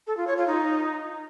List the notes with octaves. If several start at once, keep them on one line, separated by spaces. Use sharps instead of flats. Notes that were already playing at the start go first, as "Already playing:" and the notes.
A4
F4
C#5
F4
D#4